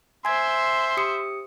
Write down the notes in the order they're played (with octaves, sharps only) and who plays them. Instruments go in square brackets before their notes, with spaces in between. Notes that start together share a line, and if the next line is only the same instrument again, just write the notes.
[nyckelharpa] C5 E5 [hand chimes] G#5 G#6 [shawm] C6
[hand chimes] G4 D#6 C#7